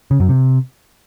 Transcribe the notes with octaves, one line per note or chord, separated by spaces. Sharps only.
C#3
F#2
C3